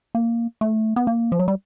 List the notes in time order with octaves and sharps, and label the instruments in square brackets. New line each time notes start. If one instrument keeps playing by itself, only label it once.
[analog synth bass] A#3
A3
B3
A#3
F3
F#3
G3